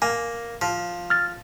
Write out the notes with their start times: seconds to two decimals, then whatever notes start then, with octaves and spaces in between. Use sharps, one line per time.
0.02 A#3 G#5
0.61 F3
1.10 F6 A6